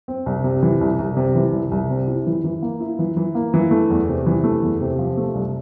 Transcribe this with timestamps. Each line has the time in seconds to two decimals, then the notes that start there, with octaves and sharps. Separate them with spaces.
0.08 C4
0.26 C2
0.44 C3
0.63 E3
0.81 C2
0.99 C2
1.17 C3
1.35 E3
1.53 C2
1.71 C2
1.90 C3
2.07 E4
2.27 E3
2.44 E3
2.62 A#3
2.80 E4
2.99 E3
3.17 E3
3.35 A#3
3.54 E3
3.71 A3
3.90 E2
4.08 C3
4.26 E3
4.44 A3
4.63 E2
4.81 C3
4.99 F3
5.17 A3
5.35 C2